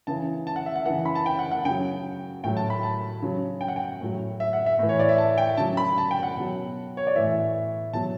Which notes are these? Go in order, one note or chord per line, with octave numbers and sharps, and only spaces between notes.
C#3 E3 A5
A5
F#5
E5
F#5
C#3 E3 F#5
B5
A5
G5
F#5
F#5
C#3 F#3 G5
A2 F#3 G5
A5
B5
A5
C#3 F#3
G5
F#5
G5
A2 F#3
E5
F#5
E5
A2 E3
C#5
D5
E5
A5
G5
C#3 F#3 A5
B5
A5
G5
F#5
B2 F#3
C#5
D5
A2 E3 E5
B2 F#3 A5